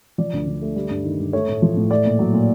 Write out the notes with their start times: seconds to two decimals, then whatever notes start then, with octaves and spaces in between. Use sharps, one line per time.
0.18 F3 D5
0.33 D2
0.47 D3
0.62 A3
0.76 G3
0.90 G2
1.04 D#3
1.19 G2
1.33 A3 C#5
1.48 A2
1.62 F3
1.76 A2
1.90 A3 D5
2.05 A#2
2.19 F#3
2.34 A#2